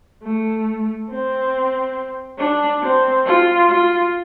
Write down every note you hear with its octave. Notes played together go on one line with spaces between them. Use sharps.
A3
C4
D4
C4
F4
F4